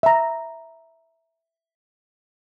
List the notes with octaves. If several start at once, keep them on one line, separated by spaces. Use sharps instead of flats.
E5 A#5